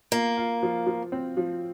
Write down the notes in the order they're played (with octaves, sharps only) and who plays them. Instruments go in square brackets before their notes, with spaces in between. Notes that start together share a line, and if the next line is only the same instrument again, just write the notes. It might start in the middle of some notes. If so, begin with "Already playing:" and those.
[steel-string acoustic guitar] A#3 [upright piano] F4
[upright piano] F4
F3
F3
C4
F3